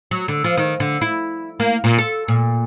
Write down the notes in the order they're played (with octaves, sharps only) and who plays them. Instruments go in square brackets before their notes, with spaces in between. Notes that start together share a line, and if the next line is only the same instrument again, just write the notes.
[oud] F#3
D3
F3
D#3
D3
E4
A#3
A#2
A4
A#2